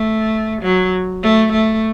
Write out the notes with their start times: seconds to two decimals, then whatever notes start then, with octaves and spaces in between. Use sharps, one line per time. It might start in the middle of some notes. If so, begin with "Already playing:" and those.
Already playing: A3
0.62 F#3
1.23 A3
1.52 A3